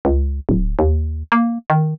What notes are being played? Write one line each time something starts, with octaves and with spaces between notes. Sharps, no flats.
C#2
D1
D#2
A#3
D#3